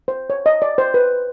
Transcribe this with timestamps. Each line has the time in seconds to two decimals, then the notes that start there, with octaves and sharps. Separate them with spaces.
0.08 C5
0.30 C#5
0.46 D#5
0.62 D5
0.78 C5
0.94 B4